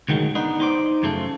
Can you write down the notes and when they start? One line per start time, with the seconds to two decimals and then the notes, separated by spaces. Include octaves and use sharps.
0.09 D2 D#3 F#3 G#3
0.35 B3 D4 D#4
0.60 D#4 C5 D5
1.03 F#2 C#3 F3 A3